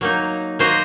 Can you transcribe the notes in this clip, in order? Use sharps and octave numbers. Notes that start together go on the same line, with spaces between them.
F#3 A#3 D#4
A#3 F#4 C5 D#5